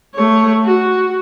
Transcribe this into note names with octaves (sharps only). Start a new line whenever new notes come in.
A3 C#5
F#4